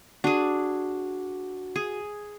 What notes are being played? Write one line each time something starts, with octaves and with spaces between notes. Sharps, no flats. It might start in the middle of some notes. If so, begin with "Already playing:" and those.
D4 F#4 G#4
G#4